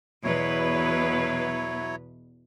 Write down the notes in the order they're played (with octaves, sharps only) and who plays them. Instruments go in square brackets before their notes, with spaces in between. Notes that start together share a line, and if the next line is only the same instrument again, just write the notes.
[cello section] E2 B2 B4 [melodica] F#3 E4 C#5